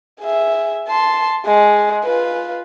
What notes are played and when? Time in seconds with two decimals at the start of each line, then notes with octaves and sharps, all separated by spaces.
0.20 G#4 E5
0.88 A5 C6
1.45 G#3
2.04 F4 B4